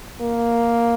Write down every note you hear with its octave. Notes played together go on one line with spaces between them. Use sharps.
A#3